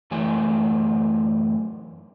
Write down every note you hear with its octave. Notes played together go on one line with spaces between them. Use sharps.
F#2 E3 A3 G4 G#5